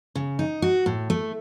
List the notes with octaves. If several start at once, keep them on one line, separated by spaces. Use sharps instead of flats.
C#3
D#4
F#4
A2
A3